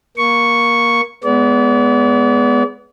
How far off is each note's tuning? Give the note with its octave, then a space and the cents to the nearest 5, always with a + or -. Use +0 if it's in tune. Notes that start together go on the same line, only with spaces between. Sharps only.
A#3 +15 C#6 +0
G#3 +10 B3 +0 D5 -40